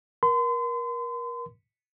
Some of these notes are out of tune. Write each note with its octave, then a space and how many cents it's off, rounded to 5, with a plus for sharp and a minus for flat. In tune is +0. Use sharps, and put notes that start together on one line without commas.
A#4 +30 C6 -40